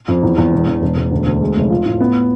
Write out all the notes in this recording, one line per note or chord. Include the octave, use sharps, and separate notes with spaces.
F2
E2
E2
E1
E1
E1
E1
D2
D2
G#3
F1
F4
A2
B3